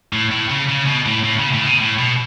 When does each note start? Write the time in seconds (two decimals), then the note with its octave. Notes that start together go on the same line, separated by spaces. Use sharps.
0.13 A2
0.31 A2
0.50 C#3
0.69 C#3
0.87 B2
1.06 A2
1.24 A2
1.38 C#3
1.53 A2
1.66 B2
1.81 A2
1.99 B2